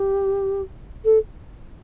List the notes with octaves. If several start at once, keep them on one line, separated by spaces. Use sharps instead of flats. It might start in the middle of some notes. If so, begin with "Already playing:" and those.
Already playing: G4
A4